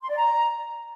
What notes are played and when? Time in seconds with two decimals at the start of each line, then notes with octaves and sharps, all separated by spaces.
0.02 C6
0.09 D5
0.16 A#5